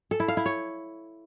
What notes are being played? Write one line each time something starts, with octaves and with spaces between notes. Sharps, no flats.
A4
E4
F5
E4
C#5